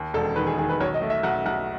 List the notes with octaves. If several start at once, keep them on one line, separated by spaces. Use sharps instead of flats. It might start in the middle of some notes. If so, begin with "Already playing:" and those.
Already playing: D#2
E1 A4
D#3 B4
G#4
D#3 G#4
B4
B1 C#5
D#5
A3
E5
B1 F#5
B1 F#5